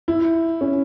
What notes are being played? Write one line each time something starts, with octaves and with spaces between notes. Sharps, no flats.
E4
C#4